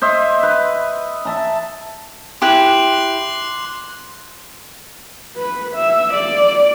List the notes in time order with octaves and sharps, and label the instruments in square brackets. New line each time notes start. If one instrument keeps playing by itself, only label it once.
[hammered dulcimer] C5 D#5 E5
B4
E5 A5 A#5
[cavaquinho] E4 G4 [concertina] C6 [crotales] D6 F#6 F#7
[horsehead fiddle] B4
E5
D5